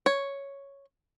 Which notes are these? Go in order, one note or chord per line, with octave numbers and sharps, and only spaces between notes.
C#5